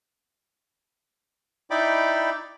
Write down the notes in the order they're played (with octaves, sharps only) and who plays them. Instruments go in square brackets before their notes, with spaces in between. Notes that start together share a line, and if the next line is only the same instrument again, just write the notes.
[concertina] D#4 E4 D5 G5 B5 D6